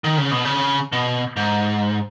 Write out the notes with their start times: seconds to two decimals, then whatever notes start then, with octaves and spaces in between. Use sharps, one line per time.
0.04 D#3
0.18 C#3
0.31 B2
0.45 C#3
0.92 B2
1.36 G#2